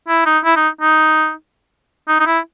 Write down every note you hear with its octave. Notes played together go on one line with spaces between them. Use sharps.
E4
D#4
E4
D#4
D#4
D#4
D#4
E4